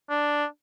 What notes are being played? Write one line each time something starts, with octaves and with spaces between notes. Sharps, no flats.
D4